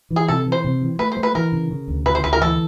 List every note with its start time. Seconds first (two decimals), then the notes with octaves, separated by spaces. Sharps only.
0.10 E3
0.16 G#4
0.28 C3 A4
0.46 E3
0.52 C5
0.64 C3
0.82 E3
0.99 A3 B4
1.12 C5
1.17 A3
1.23 B4
1.35 E3 A#4
1.52 C#3
1.71 C#3
1.88 D2
2.06 C#3 B4
2.15 C5
2.24 D2 B4
2.33 A#4
2.42 E3 A4